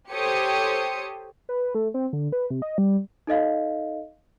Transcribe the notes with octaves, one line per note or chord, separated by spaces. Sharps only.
G4 A4 C5 C#5 D#6 C#7
B4
A3
C4
D3
B4
C3
D#5
G3
D#4 A4 D#5 F5